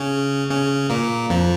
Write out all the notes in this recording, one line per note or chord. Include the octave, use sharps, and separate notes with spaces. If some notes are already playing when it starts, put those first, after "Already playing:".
Already playing: C#3 C#4
C#3 C#4
A#2 A#3
F2 F3